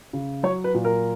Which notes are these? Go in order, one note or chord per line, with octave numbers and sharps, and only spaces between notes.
C#3
F#3 C#5
B4
A#2
A#4